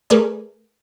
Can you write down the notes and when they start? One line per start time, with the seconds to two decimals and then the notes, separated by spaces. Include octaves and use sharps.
0.10 A3 G#4 A#4 B4 D5 G#5